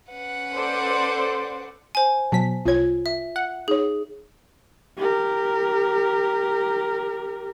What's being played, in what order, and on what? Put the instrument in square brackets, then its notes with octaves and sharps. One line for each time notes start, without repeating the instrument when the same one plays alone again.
[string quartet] C#4 B4 F#5
[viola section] A4 C5 D5
[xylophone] C5 G#5
[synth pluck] B2 F#3 B6 [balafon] A5
[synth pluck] C2 G#6 [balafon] F4 C#5
[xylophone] E5
[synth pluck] F#5
[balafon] D#4 C#5 [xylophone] G#4
[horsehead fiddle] G4 A#4